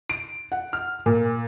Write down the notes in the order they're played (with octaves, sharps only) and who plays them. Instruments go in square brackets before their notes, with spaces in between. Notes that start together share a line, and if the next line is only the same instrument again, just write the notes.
[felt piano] D7
F#5
F6
A#2